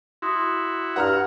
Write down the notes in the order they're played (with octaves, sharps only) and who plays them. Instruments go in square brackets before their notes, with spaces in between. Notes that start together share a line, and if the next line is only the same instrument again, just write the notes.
[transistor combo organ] E4 F#4 [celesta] C6 D#6
[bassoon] G2 [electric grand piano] F#5 A#5 F6